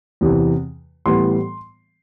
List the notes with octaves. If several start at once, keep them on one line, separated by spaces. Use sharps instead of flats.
E2 C3 E3
A2 E3 G3 B3 C6